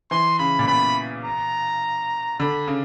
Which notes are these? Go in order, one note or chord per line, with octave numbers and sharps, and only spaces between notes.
E3 C6
C#3 B5
A#2
B2 B5
A#5
D3 B5
C#3